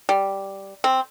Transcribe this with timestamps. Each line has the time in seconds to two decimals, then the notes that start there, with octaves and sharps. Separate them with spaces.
0.09 G3
0.84 C4